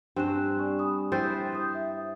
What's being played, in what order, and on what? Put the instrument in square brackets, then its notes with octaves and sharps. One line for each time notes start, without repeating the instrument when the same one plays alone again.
[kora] G2 C4 [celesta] G#5 F#6 E7
[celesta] D5 G#5 C#6
G#5 B5 D#6
[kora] E4 B4 C5 [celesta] G5 A6
[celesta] D#6 G6
E5